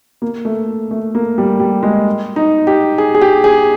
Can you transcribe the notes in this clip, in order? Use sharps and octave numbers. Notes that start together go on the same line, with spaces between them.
A#3
A3
A3
A#3
G3
G3
G#3
D#4
G4
G#4
G#4
G4
G#4